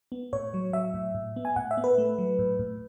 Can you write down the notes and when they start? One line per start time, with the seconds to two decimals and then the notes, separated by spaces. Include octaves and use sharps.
0.12 B3
0.33 A2 C#5
0.54 F#3
0.73 F#3 E5
0.94 A2
1.15 A2
1.36 B3
1.45 G#5
1.56 A2 F#5
1.71 E5
1.77 B3
1.84 B4
1.98 A3
2.18 F#3
2.39 A2
2.59 A2